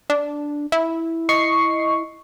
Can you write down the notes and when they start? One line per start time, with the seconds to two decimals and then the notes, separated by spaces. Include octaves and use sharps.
0.10 D4
0.72 E4
1.29 D#5 C#6 C7